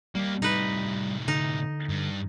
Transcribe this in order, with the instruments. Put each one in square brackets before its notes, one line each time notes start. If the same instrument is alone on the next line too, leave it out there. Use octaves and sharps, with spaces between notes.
[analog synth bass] G3 [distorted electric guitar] A#3 G4
[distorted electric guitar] A2 C3 [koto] D#4 B4
[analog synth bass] D3 [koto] D#4
[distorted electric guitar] G2